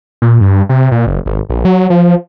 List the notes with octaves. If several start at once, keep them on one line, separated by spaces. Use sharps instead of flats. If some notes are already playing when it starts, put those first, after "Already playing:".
A#2
G2
C3
A#2
F#1
G#1
A#1
F#3
F3